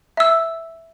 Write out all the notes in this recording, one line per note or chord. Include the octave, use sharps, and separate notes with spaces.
E5 E6